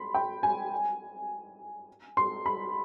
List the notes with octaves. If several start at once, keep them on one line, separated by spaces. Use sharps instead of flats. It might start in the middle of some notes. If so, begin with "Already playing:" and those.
Already playing: B5 C6
G5
G#5
C6
B5